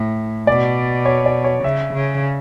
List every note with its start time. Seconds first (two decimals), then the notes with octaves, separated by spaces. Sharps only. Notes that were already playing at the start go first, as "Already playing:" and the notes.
Already playing: A2
0.47 B2 D5
1.05 C#5
1.26 D5
1.44 C#5
1.64 C#3 E5
1.94 C#3